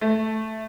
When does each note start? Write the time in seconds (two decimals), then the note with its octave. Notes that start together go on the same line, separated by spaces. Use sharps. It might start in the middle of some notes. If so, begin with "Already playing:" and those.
0.01 A3